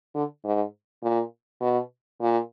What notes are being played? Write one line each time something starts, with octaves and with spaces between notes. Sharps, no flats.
D3
G#2
A#2
B2
A#2